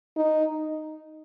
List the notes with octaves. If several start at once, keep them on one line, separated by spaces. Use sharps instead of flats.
D#4